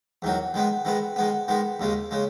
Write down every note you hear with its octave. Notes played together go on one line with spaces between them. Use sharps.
E2 D#3 F#3
D#3 G#3 B3
D#3 G#3 B3
D#3 G#3 B3
D#3 G#3 B3
D#2 C#3 G#3
C#3 G#3